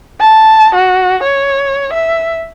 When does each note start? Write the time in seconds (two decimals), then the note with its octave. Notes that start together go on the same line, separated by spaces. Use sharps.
0.20 A5
0.75 F#4
1.23 C#5
1.93 E5